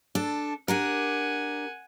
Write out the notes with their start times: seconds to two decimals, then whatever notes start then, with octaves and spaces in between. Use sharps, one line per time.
0.15 D4 A4
0.68 D4 G4 A#4 F#5 G#5